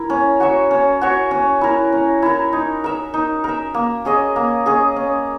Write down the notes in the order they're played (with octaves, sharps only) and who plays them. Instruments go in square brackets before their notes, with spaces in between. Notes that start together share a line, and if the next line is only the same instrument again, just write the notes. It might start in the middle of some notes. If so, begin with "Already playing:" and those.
Already playing: [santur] E4 A#4
C#4
F#4 C#5 E5
C#4
F#4 C#5 E5
C#4
E4 A#4
C#4
E4 A#4
D#4
A#4 E5
D#4
A#4 E5
A#3
C#4 G#4 D#5
A#3
C#4 G#4 D#5
C#4